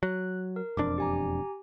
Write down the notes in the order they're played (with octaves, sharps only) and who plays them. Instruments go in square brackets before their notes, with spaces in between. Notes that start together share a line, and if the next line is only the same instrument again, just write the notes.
[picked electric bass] F#3 [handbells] F#6
[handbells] A#4
[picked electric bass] E1 F2 D4 [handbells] D6
[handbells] G4 G#5 A#5